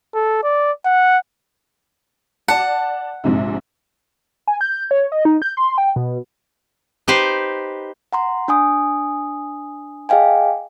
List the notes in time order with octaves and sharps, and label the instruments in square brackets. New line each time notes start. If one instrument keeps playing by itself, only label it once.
[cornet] A4
D5
F#5
[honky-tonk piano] D5 A5 [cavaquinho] F#5
[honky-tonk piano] A#1 G#2 C3
[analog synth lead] G#5
G6
C#5
D#5
D#4
G6
C6
G5
B2
[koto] D#4 G4 B4 C5
[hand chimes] F#5 A#5 C6
D4 G#5 D#6
G#4 D#5 F5 G5 G#5